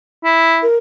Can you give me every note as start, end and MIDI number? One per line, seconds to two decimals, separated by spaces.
0.24 0.64 64
0.63 0.77 70